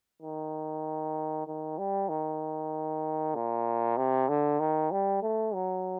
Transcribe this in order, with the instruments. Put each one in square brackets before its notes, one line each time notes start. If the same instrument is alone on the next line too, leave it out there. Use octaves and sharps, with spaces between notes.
[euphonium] D#3
D#3
G3
D#3
A#2
C3
D3
D#3
G3
A3
F#3